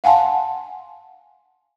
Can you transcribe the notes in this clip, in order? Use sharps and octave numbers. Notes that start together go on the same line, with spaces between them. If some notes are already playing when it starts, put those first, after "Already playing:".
F5 F#5 G#5 A5 C6